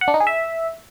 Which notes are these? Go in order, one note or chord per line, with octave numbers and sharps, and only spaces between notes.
F#5
D4
D#4
G#4
E5